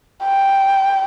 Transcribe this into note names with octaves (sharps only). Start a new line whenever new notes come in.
G5